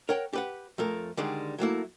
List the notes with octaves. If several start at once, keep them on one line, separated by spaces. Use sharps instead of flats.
A#4 C#5 F#5 G5
G4 B4 F#5
F2 A3 A#4
D3 D#3 G3 G#3
F#3 A3 A#3 E4